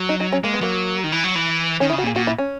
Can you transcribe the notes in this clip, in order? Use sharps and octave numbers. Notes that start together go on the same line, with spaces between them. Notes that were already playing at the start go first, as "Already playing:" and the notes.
Already playing: F#3
D#4
D#4
C#4
G#3 A#3
B3
F#3 A#3
D#3
E3
F#3
E3
D#3 C#4
E4
C#3
F#4
A#2
G#4
A#2 F#4
E4
C#4